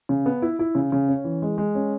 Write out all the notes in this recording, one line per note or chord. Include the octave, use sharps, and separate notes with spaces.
C#3
B3
E4
E4
C#3
C#3
C#4
E3
G#3
G#3
C#4